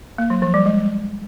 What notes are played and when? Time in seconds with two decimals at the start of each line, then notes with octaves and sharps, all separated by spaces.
0.18 A#3
0.30 F#3
0.42 F3
0.54 G3
0.66 G#3